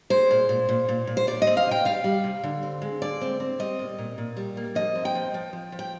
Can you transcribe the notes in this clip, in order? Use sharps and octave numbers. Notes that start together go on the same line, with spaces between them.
G#3 C5
A#2
A#2
A#2
A#2
A#2
C5
G3 D5
D#5
C4
F5
C3
G5
G3 F5
G3
C3
D3
C4
G#3
D3 D5
C4
C4
G3 D#5
A#2
A#2
A#2
G3
A#3
F3 D#5
C4
G5
F3
F3
F3
F3
G5